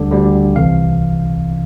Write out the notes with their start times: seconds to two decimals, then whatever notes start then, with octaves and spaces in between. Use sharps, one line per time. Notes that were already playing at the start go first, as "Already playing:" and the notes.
Already playing: D2 D3 G3 D5
0.11 D2 D3 G3
0.55 C2 C3 E3 F5